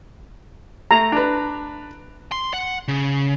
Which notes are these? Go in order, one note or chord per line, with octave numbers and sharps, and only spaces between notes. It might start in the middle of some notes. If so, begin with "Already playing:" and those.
A3 A#5
D4 B4
C6
F#5
C#3